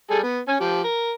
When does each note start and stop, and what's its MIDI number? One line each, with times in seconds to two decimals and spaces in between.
0.11 0.19 55
0.11 0.19 68
0.11 0.19 69
0.23 0.39 59
0.48 0.56 61
0.48 0.56 80
0.60 0.81 53
0.60 0.81 67
0.84 1.12 70